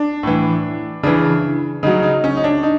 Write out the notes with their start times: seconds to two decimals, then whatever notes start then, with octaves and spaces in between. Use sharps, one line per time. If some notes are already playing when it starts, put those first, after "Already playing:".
Already playing: D4
0.23 A2 E3
1.03 C#3 E3 D4
1.83 C#3 F#3 D#4
2.03 D#4
2.24 C#4
2.37 D#4
2.44 D4
2.63 D#4